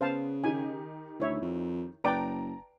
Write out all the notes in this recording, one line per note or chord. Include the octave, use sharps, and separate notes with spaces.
C#3 B3 C5 F5 A5
D#3 D#4 G4 G#5
D2 E4 C#5 E5
F2
F#1 B4 D5 G5 A5 A#5 D7